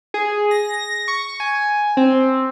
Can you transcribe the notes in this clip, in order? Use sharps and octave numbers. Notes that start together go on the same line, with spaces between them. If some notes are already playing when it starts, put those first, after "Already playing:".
G#4
A#6
C#6
G#5
C4